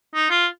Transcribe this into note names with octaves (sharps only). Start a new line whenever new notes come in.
D#4
F4